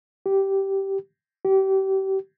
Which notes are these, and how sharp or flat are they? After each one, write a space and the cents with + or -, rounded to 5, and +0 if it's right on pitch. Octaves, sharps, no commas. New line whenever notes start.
G4 -10
G4 -30